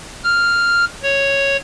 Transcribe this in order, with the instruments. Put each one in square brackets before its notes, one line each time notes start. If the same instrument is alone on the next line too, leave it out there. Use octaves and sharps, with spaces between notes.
[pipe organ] F6
C#5